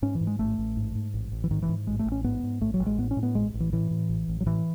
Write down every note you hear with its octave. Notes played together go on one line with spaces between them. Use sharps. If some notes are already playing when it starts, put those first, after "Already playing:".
G#2 C#4
E3
G#2
G#3
A1 A3
A1
G#2
G#2
A1
A1
E3
G#2 D#3
E3
G#2
A1 G#3
A3
A1
C#4
G#2 B3
G#2
A1 A3
F#3
A1
G#3
A2 B3
C#4
A2
B3
A1 G#3
A1
E3
A2 E3
A2
A1
A1
F#3
A2 E3